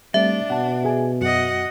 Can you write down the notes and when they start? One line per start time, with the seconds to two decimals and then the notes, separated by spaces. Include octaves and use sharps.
0.14 G3 A3 C4 D4 E5
0.50 B2 F#5 A5
0.85 G#4 G#5
1.21 F#2 F#4 D#5 F#5